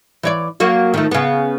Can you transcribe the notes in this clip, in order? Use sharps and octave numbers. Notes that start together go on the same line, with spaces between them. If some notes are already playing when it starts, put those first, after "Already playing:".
E3 C#5 D5
F#3 A#3 F#4
D#3 F3 A3
C#3 B3